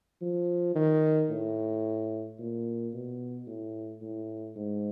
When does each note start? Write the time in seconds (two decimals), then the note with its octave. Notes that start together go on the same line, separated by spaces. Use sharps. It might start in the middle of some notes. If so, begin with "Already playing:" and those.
0.21 F3
0.75 D#3
1.30 A2
2.39 A#2
2.93 B2
3.47 A2
4.02 A2
4.56 G#2